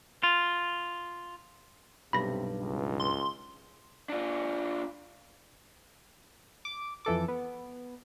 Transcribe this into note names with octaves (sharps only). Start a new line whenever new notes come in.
F4
B1 G2 C3 B5 A#6
C#2
C6
D4 F4
D6
F2 E3 A4 D6
B3